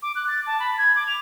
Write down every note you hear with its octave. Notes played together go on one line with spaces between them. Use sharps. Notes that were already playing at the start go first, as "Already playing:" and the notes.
D6
F#6
A6
A5
B5
G#6
D6
F7